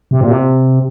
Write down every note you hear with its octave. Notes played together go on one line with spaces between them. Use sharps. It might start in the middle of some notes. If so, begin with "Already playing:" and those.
C3
A#2
C3